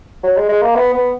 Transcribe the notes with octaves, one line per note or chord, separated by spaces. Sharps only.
F#3
G#3
G#3
A#3
B3
B3